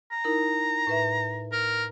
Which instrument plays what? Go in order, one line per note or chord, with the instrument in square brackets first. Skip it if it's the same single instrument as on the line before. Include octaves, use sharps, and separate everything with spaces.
[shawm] A#5
[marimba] D#4 E4 A#4
A2 B4 E5
[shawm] A#4 [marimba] A#5